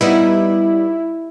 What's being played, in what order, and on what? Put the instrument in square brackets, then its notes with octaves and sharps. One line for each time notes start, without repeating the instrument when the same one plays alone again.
[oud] G3 B3 D#4 [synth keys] E4